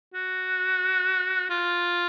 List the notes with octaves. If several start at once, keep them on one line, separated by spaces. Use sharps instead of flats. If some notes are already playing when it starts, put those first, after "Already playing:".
F#4
F4